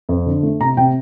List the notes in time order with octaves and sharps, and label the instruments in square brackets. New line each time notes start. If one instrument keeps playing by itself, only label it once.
[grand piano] F2
D3
A3
C3 A#5
C3 G5